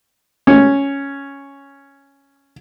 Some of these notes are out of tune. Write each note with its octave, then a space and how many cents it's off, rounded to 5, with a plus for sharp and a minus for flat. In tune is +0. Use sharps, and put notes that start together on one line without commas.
C#4 +0